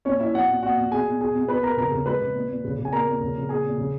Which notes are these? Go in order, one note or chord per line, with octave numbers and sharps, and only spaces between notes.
A#2 C#4 C#5
A#2 E4 E5
A#2 F#4 F#5
A#2
A#2 F#4 F#5
A#2
B2 G#4 G#5
B2
B2 G#4 G#5
B2
B2 B4 B5
B2 A#4 A#5
C#3 A#4 A#5
C#3
G#3 B4 B5
C#3
A#2
A#2
C#3
C#3
G#5
A#2 A#4 A#5
A#2
C#3
C#3
A#2 G#4 G#5
A#2
C#3